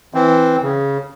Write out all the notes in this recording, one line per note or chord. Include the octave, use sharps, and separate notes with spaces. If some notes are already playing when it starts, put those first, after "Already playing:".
E3 C4
C#3